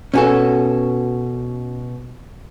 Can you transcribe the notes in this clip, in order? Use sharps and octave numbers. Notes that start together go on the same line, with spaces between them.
B2 C#4 F#4 A4 G#5